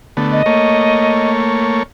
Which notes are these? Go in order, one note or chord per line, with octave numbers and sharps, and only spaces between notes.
D3 A3 B3
D#5
A3 A#3 C#5